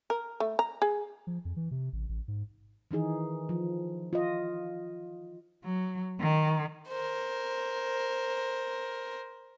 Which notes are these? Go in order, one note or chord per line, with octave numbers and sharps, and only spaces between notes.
A#4
A3
A#5
G#4
F3
F2
E3
C3
A1
A1
G#2
D#3 E3 D#4 G#4
F3
F4 D#5
F#3
D#3
A#4 C5